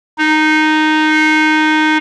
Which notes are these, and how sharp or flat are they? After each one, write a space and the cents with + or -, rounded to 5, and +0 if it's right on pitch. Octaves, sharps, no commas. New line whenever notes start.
D#4 -10